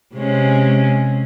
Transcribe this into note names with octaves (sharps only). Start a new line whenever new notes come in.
C3 G#3 C#4